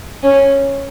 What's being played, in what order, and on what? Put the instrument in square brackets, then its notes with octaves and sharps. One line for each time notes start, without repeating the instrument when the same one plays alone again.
[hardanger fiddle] C#4